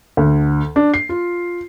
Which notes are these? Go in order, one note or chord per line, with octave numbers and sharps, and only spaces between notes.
D2
D4
C7
F4